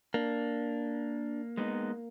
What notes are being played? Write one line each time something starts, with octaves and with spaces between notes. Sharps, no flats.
A#3 D4
G#3 B3 D#4